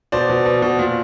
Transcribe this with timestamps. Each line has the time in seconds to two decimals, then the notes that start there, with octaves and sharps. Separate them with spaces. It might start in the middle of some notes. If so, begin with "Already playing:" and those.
0.12 B2 C5 D5
0.29 B2
0.46 B2
0.62 B2
0.79 A#2